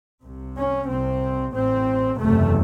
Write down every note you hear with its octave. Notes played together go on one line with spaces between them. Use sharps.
C2 C3
C#4
C2 C3 C4
A1 A2 C4
F#1 E2 C3 A3